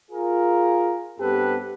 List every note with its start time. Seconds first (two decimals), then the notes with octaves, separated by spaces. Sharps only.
0.11 F4 G#4 A#4
1.20 G2 B3 C4 G4 A4 B4